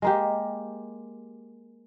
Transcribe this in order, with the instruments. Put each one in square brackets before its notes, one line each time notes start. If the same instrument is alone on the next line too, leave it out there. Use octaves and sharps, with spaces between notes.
[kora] G#3 A#3 G4